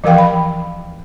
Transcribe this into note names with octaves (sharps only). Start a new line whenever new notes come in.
E3 F3 A#4 F5 G5
B5